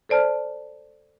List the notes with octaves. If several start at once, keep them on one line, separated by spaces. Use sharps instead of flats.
A4 C5 D5 A5 F6